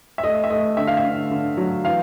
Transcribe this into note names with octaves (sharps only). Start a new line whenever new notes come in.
E5
A3 D#5
E5
A3 D#5
D3 E5
F5
E5
D3
D3
F#3
E3 F5